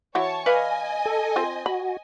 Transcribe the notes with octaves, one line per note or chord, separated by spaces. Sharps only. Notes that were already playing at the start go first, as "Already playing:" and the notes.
E3 E4 F#4 C#5 A5 C#6
B4 D5 D#5 F5 G#5
A4
C4 F4 C5
F#4 B5